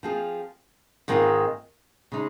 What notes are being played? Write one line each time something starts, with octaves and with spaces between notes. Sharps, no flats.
F3 C4 F4 G#4
G#2 D#3 G#3 C4 F4
C#3 G#3 D#4